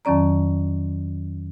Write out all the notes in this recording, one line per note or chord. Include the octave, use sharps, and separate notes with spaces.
F2 D#3 F#3 C#4 D5 A#5